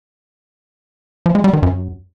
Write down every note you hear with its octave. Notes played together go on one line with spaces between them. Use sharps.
F3
G#3
G3
D#3
F#2